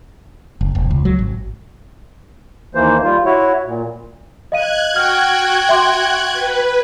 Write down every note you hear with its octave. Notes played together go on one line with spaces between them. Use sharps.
F#1
E1
C#2
F#3
G#1
D#2 E3 A#3 C5
G3 F4
E4 F#4 C#5
A#2
D#5 F5 F#6 G#6 D#7
F#4 G5 F6
E5 C6 D6
B4